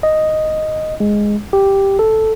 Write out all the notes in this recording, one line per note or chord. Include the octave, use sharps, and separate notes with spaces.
D#5
G#3
G4
A4